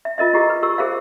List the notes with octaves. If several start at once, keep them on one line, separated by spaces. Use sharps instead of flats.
E5
F4 A#4 D#5 E5
E4 F4 G4 G#4 D#5
B4
G4 A#4 C#6 E6
G4 G#4 A#4 C5 E5 F5